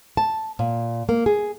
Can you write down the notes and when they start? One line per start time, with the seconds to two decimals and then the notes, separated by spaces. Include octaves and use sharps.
0.17 A5
0.59 A#2
1.09 A#3
1.26 G#4